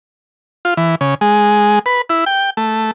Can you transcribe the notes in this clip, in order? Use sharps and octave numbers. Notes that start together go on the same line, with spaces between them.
F4
E3
C#3
G#3
B4
E4
G5
A3